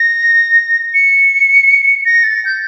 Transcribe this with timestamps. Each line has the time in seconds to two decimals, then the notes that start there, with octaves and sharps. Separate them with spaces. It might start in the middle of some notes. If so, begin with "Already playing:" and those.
Already playing: A#6
0.94 C#7
2.06 A#6
2.24 A6
2.45 G6